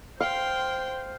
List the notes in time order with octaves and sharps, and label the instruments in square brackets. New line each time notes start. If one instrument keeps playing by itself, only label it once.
[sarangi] C5 [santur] F5 [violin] G5 C6